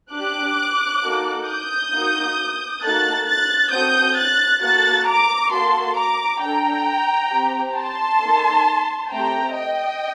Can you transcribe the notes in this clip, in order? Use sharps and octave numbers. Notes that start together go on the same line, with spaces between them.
D4 G4 D6 F#6
A#3 D#4 F#4 A4
D#6 G6
A#3 D#4 F#4
A#3 D#4 F#4 A4 F#6 A6
F#6 A6
C4 F#4 A4 D#6 G6
F#6 A6
A#3 F#4 A4 F#6 A6
A#5 D6
A#3 F#4 A4 A5 C6
A#5 D6
D4 A4 G5 A#5
C4 G4
A5 C6
A#3 D#4 A4
A3 C4 G4 G5 A#5
D#5 G5